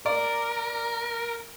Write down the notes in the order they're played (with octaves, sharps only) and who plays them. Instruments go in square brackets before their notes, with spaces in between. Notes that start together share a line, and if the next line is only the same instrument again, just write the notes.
[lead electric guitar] A#4 [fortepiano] D5